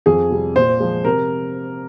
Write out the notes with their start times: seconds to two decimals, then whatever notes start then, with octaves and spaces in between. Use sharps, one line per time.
0.06 F2 G#4
0.30 C3 G3
0.56 A#2 C5
0.80 F3 G#3
1.05 C3 A#4